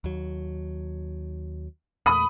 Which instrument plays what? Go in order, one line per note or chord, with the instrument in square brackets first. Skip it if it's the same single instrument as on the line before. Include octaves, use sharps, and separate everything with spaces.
[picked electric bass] D#2 F#3
[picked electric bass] E2 A#2 A3 [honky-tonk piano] B5 D#6